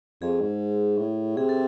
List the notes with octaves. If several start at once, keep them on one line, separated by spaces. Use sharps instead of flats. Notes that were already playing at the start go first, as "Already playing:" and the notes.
F2 G#4
G#2
A2
C3 G#4
A4